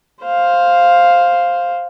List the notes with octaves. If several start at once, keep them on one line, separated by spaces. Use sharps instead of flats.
C5 F5